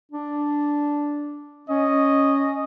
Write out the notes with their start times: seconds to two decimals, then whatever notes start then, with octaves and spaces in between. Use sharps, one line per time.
0.12 D4
1.69 C#4 D#5